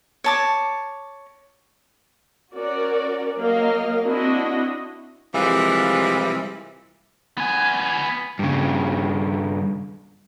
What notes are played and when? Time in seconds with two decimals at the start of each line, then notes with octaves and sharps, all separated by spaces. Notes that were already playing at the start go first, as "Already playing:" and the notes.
0.24 C#5 A5 D6
2.54 C#4 F#4 A#4 D5
3.38 F#3 A#3 A#4 D#5 F5
4.05 C4 D4 E4 F#4 D#5
5.34 C3 E3 F3 G3 G#3 A#3
7.38 B3 G#5
8.39 G2 C#3